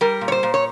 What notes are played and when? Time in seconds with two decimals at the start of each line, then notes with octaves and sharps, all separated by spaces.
0.01 G3 A#4
0.21 A#2
0.28 C#5
0.32 C5
0.43 A#2
0.54 C#5